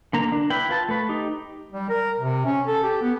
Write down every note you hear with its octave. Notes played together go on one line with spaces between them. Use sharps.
D3 A#3 A#5
D4
E4 B4 G5 B5
F4 B4 A5
A3 B4
D#4 G4
G3
A#4
C3
C#4
A4
G4
B3